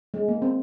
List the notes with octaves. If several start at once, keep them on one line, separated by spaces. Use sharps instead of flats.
G#3
A#3
C4